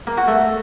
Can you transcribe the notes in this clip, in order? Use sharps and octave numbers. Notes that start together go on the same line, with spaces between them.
A#3
F#4
A3